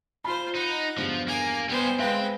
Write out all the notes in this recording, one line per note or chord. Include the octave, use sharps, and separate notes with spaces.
F4 C5 B5
D#4 F#5
E2 G2 F3
A#3 G#5
G3 B3 C5 G#5
G#3 C4 B4 F5 G5